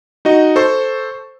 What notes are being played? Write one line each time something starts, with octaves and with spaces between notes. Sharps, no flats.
D#4 F#4 D#5
A4 C5 C#6